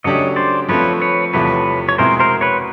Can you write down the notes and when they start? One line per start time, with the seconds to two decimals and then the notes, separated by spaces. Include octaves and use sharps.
0.04 C#3 F#3 A3 D4 G4 C#5 D#5
0.36 C5 D5
0.69 F3 A3 C4 B4 C#5
1.01 B4 C#5
1.33 E2 C3 F3 A3 B4 C#5
1.89 C#5
1.98 B2 G#3 C4 E4 G#4 A#4 C5
2.20 A#4 C5
2.41 B4 C#5